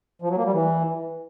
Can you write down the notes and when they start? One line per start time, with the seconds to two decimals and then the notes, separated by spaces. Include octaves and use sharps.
0.22 F3
0.30 F#3
0.37 A#3
0.45 G3
0.53 E3